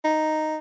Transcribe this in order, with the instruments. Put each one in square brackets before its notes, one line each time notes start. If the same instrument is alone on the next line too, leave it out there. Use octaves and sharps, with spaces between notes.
[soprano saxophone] D#4